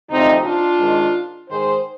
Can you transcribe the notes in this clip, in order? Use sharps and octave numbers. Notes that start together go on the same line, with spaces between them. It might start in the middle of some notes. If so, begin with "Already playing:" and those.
D2 C3 F3 C4 D#4
D4 F4
G#2 D#3
G#2 D#3 G#4 C5